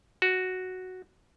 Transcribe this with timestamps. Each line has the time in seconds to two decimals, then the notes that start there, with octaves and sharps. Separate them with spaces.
0.22 F#4